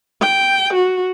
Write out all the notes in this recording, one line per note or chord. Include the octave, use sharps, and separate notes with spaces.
G5
F#4